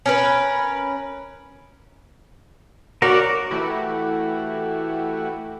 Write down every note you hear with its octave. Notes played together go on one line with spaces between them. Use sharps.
C#4 A#4 B4
F#4 A#4 C#5 D5
E3 A3 E4 F#4 G4